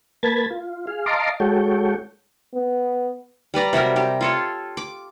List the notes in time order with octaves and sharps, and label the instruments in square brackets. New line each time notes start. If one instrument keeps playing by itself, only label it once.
[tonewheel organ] A#3 B4 A5 B5 G#6 A6
F4
G#4 F5
D#5 F5 A5 A#5 C6 D6
G#3 F#4 A4 C#5 G5
[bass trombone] B3
[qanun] G3 B4 D5 A#5
C3 F#3 G3 A#4
G3 G4
F4 A4 C#5
D6